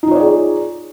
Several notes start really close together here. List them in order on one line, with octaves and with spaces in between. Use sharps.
D#4 F4 C#5 D5 G#4